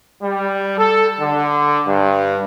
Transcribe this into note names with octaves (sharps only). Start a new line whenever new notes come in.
G3
A4
D3
G2